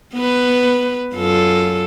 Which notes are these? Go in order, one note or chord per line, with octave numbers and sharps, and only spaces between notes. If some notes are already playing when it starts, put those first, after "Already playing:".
B3 B4
F#2 F4 A4